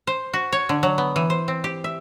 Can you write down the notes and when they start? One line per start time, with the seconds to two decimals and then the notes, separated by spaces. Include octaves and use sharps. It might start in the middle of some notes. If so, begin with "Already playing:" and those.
0.07 C5
0.33 F#4
0.52 C#5
0.69 D3
0.83 F#3
0.98 B3
1.16 E3
1.30 C5
1.48 C4
1.64 G4
1.84 E5